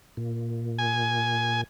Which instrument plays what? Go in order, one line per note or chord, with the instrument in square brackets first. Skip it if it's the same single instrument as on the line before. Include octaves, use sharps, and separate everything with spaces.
[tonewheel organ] A#2
[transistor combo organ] G#5